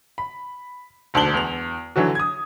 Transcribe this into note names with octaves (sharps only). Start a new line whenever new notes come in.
B5
E1 D2 D4 A5 F#7 G7
E2 F7
D3 E3 F#3 F#4
D#6 G#6